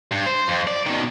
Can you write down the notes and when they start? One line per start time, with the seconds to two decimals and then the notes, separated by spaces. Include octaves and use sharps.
0.11 G2
0.26 C5
0.48 F2
0.68 D5
0.87 B2 D#3